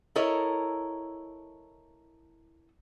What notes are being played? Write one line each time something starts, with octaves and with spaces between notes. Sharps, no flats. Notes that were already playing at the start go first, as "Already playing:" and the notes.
E4 A4 A#4 C#5 D#5